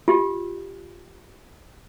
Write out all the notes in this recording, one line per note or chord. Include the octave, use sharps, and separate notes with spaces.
F4 G4